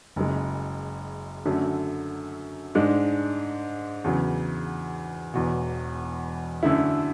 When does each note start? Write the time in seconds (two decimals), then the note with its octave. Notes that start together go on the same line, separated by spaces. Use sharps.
0.16 F#1 F#2 C#3 G#3
1.45 F#2 D3 F#3 A3
2.75 G#2 G#3 D4
4.04 E2 C#3 F#3
5.34 E1 E2 B2
6.63 F#2 D3 A3 E4